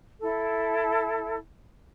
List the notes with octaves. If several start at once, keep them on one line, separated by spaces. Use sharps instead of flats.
E4 A4